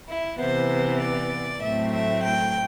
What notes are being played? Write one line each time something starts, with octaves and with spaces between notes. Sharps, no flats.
E4
C3 E3 B3 C5
D5
A2 F#3 A3 C4 E5
E5
G5